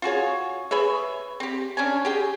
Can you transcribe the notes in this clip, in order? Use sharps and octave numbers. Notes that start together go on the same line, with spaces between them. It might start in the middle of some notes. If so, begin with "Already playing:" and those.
F4 F#4 G#4 C#5
G#4 B4 C#5 E5
C4 G4
C#4 D4 C#5 G#5
G4 G#4 G5